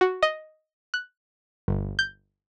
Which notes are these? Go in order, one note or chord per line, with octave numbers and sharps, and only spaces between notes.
F#4
D#5
F#6
G1
G6